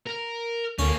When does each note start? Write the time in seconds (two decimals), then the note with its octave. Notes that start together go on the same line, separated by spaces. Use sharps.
0.07 A#4
0.79 D2 A3 A#3 C#4